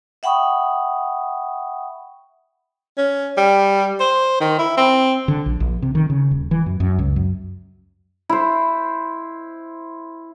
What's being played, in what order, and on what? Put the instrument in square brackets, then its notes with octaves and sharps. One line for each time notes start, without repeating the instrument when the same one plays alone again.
[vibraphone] E5 F#5 G5 B5 C#6 D#6
[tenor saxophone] C#4
G3
C5
D#3
E4
C4
[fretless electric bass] D3
A#1
A#1
C3
D#3
C#3
D#1
E3
F#2
F#2
C#2
F#2
[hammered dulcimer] E4 C5